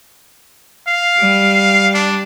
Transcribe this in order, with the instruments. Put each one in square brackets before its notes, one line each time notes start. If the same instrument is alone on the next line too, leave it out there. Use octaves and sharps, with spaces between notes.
[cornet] F5
[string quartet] G3
[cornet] D4